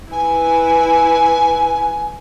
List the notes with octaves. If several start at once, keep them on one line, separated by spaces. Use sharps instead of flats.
E4 B4 G#5